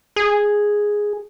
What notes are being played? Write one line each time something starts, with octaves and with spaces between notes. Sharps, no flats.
G#4